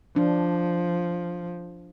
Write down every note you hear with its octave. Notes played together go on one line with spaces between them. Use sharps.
F3 D4